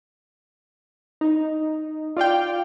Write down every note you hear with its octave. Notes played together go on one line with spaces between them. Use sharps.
D#4
F4 D5 F5 G5